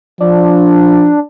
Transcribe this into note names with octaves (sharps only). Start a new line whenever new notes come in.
F3 D4